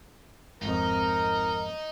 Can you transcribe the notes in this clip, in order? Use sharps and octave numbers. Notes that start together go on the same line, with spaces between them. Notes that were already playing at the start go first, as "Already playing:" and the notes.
G#1 F2 D#4 A#4